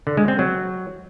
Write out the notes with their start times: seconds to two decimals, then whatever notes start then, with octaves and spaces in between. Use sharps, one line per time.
0.07 D3
0.17 G#3
0.28 C4
0.39 F#3